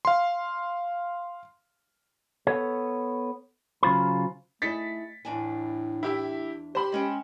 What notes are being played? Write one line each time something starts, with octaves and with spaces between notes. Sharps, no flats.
F5 C6
B3 A4 C#5
C#3 F#3 F4 C5 B5
A3 D#4 E4 G#4 A6 B6 C#7
E2 A2 D4 G#5
E4 G4 E5
G4 C5 B5 C6
G#3 C#4 G5